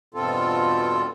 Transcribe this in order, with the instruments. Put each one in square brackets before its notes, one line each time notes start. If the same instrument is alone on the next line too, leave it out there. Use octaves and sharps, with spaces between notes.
[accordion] E2 G2 B2 C4 F4 A4